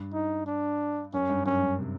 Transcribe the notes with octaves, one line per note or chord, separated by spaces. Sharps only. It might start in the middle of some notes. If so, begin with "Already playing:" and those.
Already playing: G2
D#4
D4
F#2 C#4
G2
F#2 C#4
G2
C3